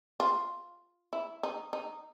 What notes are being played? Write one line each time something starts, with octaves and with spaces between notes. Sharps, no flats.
F4
E4
D#4
D#4